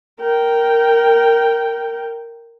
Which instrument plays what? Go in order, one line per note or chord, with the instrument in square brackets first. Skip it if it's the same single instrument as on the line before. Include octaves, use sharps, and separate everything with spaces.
[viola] A#4 G5